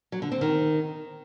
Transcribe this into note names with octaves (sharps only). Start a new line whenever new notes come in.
F#3
D3
C4
D#3